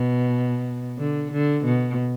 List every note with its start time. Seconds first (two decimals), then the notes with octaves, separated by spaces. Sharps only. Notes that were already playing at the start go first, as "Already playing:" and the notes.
Already playing: B2
0.98 D3
1.32 D3
1.65 B2